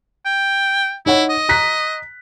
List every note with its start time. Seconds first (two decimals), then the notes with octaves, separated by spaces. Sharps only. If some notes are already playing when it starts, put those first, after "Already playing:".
0.26 G5
1.06 D#4 E4 C#5 F#5
1.30 D#5
1.49 A#5 F#6 B6